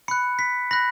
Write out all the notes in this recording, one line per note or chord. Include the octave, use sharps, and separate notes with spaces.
B5 F#6 C#7
B6
B5 F#6 A#6